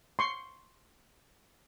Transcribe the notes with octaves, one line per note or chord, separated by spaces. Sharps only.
C6 C#6